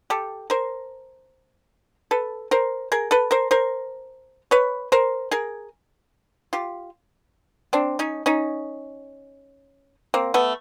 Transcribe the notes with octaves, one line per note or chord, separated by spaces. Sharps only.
G4 A4
A#4 C5
A4 B4
A#4 C5
G#4 A#4
A4 B4
A#4 C5
A#4 C5
B4 C#5
A#4 C5
G#4 A#4
F4 G4
C4 D4
C#4 D#4
C#4 D#4
A#3 C4
A3 B3